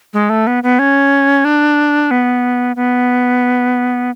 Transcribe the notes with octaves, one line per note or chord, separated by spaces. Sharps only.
G#3
A3
B3
B3
C#4
D4
B3
B3